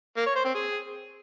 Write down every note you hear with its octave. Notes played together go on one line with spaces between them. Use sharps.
A#3
C#5
C5
C4
G#4